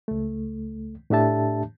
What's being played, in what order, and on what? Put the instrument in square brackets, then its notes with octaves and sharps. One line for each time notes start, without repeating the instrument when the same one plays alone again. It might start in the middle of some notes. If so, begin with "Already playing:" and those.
[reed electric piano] C#2 A3
A2 A3 D4 G4 E5 A5